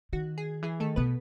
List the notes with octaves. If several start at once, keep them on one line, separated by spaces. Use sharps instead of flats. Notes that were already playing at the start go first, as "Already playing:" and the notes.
D#3 F#4
G#4
E3 G#4
D#3 A3 A4
B2 B3 B4